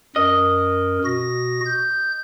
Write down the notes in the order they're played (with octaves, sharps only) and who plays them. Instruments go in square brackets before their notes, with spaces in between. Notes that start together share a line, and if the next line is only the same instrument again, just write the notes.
[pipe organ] F#2 A#4 [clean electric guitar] D#5
[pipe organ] B2 F#4 A#6
G6